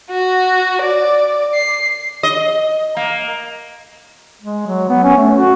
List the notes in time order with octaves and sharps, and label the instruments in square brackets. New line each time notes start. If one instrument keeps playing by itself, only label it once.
[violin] F#4
D5
C7
[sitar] D#5
A#3
[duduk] G#3
F#3
B3
C#4
A3
F#4